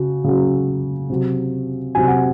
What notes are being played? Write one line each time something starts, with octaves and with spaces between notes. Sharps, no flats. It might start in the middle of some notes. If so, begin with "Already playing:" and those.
Already playing: C#3 F#4
C#3 F#3
C3 F#3
C3 F#3 G#5
F#5